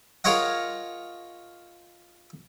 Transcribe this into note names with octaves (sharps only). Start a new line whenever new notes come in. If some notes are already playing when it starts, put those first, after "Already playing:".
F4 G#4 A#4 C#5 D#5 F#5